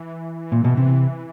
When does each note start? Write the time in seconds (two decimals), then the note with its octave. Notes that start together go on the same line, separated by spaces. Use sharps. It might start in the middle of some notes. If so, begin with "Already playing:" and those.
Already playing: E3
0.52 A#2
0.64 B2
0.77 C3